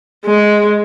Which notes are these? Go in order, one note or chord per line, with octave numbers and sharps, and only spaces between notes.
G#3